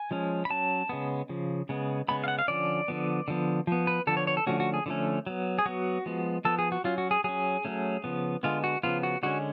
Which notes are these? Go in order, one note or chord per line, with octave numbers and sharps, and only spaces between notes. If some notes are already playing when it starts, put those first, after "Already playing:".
Already playing: G#5
F3 G#3 C#4
B5
F#3 C#4 A5
C#3 G#3 B3
C#3 F3
C#3 G#3 B3
C#3 G#3 B3 B5
F5
F#5
F5
D3 F3 A3 C#4 D5
D3 F3 B3
D3 F3 B3
F3 B3
B4
D3 F3 B3 A4
C#5
C#5
A4
D3 F3 A3 C#4 F#4
F#4
G#4
D3 F3 A3 C#4
F#3 B3
G#4
F#3 B3 F#4
F3 G#3 B3
F3 B3 A4
G#4
F#4
F#3 C#4 F4
F#4
G#4
F#3 C#4 G#4
F#3 A3 C#4
C#3 F3 B3
D3 G#3 B3 F4
F#4
C#3 F3 B3 F4
F#4
D3 G#3 C#4 F#4